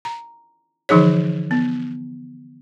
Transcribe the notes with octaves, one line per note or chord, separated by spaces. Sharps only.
A#5
D3 E3 F3 D#4 G#4 C#5
B3